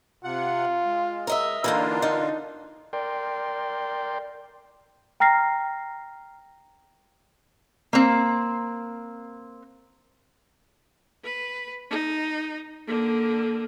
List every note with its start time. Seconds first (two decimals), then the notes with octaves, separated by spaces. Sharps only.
0.24 C3 F4 F#5
0.85 G#3
1.27 A#4 D#5 E5
1.64 D3 E3 A#3 D4 D#4 F4 A#4
2.02 D#4
2.93 A#4 D5 G5 C6
5.20 G5 A#5 F6 A#6 C7
7.93 A#3 C4
11.24 B4
11.91 D#4
12.87 D3 A#3